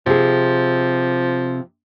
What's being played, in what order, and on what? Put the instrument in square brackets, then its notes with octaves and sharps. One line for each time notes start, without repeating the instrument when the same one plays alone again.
[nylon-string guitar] C3 G#4 [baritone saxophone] F3